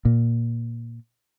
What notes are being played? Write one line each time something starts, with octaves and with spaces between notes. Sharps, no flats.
A#2